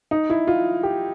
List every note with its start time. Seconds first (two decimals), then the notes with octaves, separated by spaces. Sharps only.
0.11 D#4
0.30 E4
0.47 F4
0.83 G4